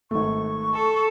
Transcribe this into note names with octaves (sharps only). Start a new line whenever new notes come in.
G#1 A3 C#6
A4